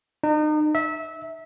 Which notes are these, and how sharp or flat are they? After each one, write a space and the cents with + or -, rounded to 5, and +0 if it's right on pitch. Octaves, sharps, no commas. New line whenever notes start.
D#4 -35
E5 -25